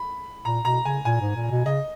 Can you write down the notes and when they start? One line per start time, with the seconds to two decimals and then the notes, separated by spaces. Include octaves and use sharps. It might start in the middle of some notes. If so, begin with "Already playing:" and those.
Already playing: B5
0.45 A#2 A#5
0.64 B2 A#5
0.85 C#3 G#5
1.05 A#2 G#5
1.21 G#2
1.35 A#2
1.50 B2
1.65 C#3 D#5